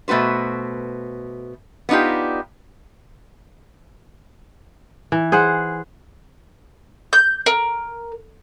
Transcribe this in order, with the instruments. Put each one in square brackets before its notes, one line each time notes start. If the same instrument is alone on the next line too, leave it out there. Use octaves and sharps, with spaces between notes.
[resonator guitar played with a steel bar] B2 A3 F#4 B4 C5
B3 D4 D#4 F4 G4
[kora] E3
G#4 C5 F#5
[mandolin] G6
A#4